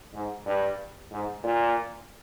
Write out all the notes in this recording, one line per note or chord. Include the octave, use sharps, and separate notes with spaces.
G#2
G2
G#2
A#2